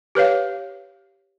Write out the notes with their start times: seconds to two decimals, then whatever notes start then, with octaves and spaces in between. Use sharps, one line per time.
0.15 G4 B4 C#5 F5